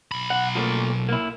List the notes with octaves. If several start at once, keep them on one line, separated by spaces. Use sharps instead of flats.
B1 B5
F#5
F3 A3 A#3
A#3 E4